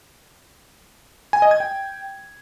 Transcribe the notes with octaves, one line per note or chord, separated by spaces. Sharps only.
G#5
D#5
G#6
G5